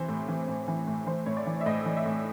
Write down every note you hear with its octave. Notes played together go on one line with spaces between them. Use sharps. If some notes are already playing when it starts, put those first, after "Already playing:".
Already playing: C3 E3 C5
A2
E3
A2
E3
A2
E3 C5
A2 C#5
D5
E3
E5
A2 D#5
E3
E5
A2